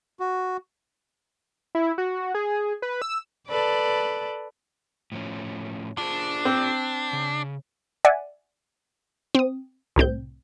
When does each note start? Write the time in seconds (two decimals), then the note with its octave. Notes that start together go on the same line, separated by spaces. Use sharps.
0.20 F#4
1.75 E4
1.98 F#4
2.34 G#4
2.82 B4
3.02 E6
3.48 A4 B4 D5
5.12 A2 F3 C#4
5.98 D4 F4 G#4 C5
6.45 C4
7.13 C#3
8.05 D5 E5 F#5 G#5
9.35 C4 D#6
9.96 C2 A2 C4 G6